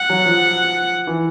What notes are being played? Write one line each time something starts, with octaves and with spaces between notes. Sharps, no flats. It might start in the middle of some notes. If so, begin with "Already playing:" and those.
Already playing: F#5
F#3
F3
E3